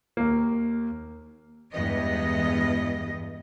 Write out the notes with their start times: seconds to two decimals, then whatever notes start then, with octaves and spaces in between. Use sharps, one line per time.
0.17 D#2 A#3
1.72 E2 G2 G#3 B3 D#5